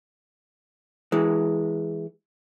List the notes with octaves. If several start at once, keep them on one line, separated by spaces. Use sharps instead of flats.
E3 G#3